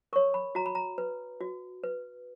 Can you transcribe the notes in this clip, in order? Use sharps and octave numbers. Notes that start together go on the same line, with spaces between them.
A#4 C#5 C#6
B5
F#4 A#5
B5
A#5
B4
F#4
B4